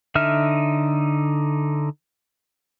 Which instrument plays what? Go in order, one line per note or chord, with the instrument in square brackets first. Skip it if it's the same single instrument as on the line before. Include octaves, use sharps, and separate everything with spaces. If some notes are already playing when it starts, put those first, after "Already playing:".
[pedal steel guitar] D3 D#4 E5 F6